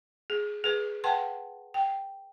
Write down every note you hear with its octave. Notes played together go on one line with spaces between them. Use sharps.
G#4
G#4 B4
B4 F#5 G5 A5 C6
G5